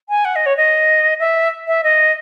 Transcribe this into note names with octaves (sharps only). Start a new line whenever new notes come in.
G#5
F#5
D#5
C#5
D#5
E5
E5
D#5